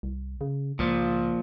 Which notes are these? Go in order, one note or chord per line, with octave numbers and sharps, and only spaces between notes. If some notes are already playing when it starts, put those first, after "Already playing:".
C2
C#3
C#2 A#2 F3